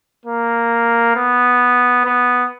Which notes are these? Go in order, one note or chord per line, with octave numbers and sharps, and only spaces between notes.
A#3
B3
B3